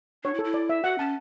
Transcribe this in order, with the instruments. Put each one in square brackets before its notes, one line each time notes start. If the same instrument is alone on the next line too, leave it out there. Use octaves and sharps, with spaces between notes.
[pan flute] D4 [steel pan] C#5
[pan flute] E4
[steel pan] A4
[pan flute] E4
[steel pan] D5
E5
[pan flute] F#4 [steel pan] F#5
[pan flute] C#4 [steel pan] A5